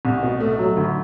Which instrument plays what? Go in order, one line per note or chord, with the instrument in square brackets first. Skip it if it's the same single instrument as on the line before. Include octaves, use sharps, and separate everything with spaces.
[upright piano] C2 [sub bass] A2
[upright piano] B2
A3
F#3
D2